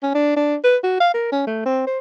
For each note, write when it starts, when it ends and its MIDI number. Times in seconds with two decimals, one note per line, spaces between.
0.03 0.11 61
0.14 0.33 62
0.36 0.56 62
0.64 0.77 71
0.83 1.00 66
1.00 1.09 77
1.14 1.29 70
1.32 1.46 61
1.46 1.63 57
1.65 1.83 60
1.86 1.99 72